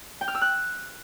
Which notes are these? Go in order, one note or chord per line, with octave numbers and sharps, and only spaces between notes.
G5
F6
E6
F#6